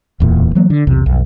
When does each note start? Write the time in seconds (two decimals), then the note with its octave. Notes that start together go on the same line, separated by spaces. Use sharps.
0.20 D1 E2 A#2
0.55 E3 F#3 A#3
0.70 D3
0.87 B1 E2 C3
1.06 B1 F2